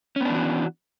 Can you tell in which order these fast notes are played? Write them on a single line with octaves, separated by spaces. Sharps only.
C#4 B3 D4 E3 F#4